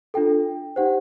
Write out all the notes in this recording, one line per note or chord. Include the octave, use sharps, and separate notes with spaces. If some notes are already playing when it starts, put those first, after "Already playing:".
D4 F4 A4 G5
D#4 G4 C5 F#5